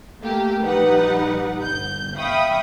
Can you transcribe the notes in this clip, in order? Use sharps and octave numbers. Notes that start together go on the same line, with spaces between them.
A3 A#3 G4
A#1 E3 G3 D#4 B4 F#5
G1 G6
E5 F5 G5 B5 C#6 D#6